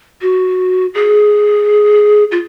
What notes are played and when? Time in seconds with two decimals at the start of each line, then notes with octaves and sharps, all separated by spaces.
0.22 F#4
0.94 G#4
2.32 F4